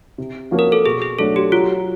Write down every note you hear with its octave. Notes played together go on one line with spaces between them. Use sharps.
C3
F3 A#3 C#4 F#4
A#4
A4
B2 G#4
G#4
F#3 A3 D4 A4
G4
F#3 F4